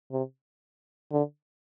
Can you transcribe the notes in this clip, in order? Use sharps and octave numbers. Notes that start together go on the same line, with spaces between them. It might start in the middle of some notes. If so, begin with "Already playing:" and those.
C3
D3